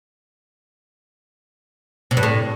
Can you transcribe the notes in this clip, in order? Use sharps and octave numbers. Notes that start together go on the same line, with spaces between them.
C3
G2
A2